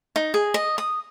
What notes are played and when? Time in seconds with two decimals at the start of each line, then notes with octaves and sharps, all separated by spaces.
0.16 D#4
0.34 G#4
0.54 D#5
0.78 D#6